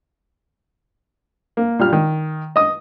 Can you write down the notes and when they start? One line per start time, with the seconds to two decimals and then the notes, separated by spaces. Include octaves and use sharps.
1.57 A#3
1.79 A#2 G3 F6
1.93 D#3
2.56 D#5 D#6